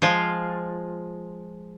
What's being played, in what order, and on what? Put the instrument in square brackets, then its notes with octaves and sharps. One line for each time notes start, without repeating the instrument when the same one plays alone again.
[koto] F3 G#3 F4